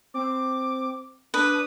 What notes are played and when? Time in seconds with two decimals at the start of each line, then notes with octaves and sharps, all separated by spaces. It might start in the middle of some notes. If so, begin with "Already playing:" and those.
0.14 C4 D6
1.34 D4 B4 D#6